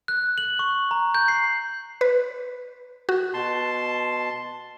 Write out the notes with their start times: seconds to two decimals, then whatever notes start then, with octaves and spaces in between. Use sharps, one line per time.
0.08 F#6
0.38 F#7
0.59 C#6
0.91 A#5
1.15 G6
1.28 C7
2.01 B4
3.09 F#4
3.34 B2 A5 C6